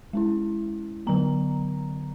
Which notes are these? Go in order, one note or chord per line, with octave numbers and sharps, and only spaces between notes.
G#3 C#4 E4
D3 F#3 B3 A#5